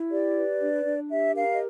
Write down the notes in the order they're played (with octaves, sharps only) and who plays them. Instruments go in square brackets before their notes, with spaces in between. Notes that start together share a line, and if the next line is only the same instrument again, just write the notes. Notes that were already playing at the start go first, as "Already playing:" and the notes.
Already playing: [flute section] E4
G4 D5
B4
D4
D4
G4 E5
A#4 F5
D#5